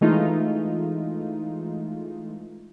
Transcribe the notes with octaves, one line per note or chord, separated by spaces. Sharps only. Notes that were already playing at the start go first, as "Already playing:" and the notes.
E3 G#3 A3 D#4 F4